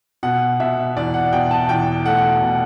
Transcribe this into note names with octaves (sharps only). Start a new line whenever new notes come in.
B2 F#5
B2 E5
E2 D5
F#5
B2 G5
A5
E2 G5
A3 F#5
B2